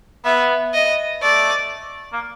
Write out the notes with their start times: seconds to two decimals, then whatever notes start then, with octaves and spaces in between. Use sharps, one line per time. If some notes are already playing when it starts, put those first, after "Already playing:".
0.25 B3 E5
0.74 D#5
1.22 A3 D5
2.13 A#3